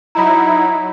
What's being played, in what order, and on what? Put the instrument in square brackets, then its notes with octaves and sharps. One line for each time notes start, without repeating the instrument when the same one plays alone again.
[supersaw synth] F#3 D#4 E4 [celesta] A#5 B5